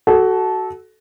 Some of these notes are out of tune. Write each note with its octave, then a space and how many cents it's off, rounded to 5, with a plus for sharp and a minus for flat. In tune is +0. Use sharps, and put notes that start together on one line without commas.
F#4 +15 A4 -15